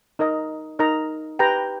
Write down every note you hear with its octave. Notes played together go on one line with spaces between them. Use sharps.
D#4 A#4 D#5 A#5
D#4 A#4 D#5 A#5
G4 B4 G5 A#5